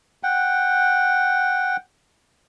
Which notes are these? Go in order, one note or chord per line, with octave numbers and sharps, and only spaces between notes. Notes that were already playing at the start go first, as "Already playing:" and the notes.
F#5 G5